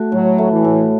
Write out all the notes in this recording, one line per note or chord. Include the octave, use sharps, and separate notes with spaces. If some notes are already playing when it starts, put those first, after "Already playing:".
Already playing: A3 F#4
A2 F#3
A3
E3
A2